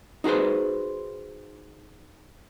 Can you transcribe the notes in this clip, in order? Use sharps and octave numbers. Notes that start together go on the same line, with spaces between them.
D#4 F#4 G#4 B4 C5